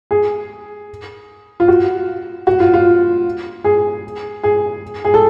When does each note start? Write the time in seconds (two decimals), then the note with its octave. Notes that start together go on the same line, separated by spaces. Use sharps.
0.11 G#4
1.60 F4
1.68 F#4
2.47 F#4
2.60 F4
2.74 F4
3.64 G#4
4.43 G#4
5.05 G#4
5.14 A4